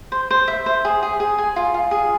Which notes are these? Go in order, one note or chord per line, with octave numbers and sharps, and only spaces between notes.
C5
C5
E5
C5
G#4
G#4
G#4
G#5
F4
F4
G#4